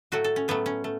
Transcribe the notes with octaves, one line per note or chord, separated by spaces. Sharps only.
A2 F#3 A3 F#4
A4
C#4
A2 F#3 A3 B3
C#4
A3